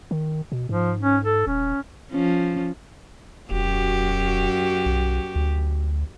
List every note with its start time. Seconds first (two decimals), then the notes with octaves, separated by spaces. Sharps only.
0.11 D#3
0.52 B2
0.69 G#2 F3
1.02 C#4
1.24 A4
1.47 D#1 C#4
2.11 F3 C#4
3.51 E1 F#2 F#4 G4
4.86 B1
5.35 D2